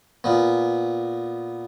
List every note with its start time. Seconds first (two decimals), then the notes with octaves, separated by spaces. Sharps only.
0.24 A#2 B3